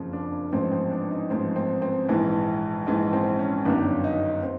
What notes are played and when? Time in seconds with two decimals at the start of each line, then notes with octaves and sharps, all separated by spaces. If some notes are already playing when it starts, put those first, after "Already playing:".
Already playing: F#1 F2 C#3 F3
0.13 D4
0.52 A1 G#2 F3 C4
0.72 C4
0.91 D4
1.11 D#4
1.30 A1 G#2 F3 C4
1.56 C4
1.82 C4
2.08 A#1 G#2 E3
2.86 A#1 G#2 E3
3.13 C4
3.39 C#4
3.65 G1 F#2 D#3 F#3 D4
4.04 D#4
4.43 C4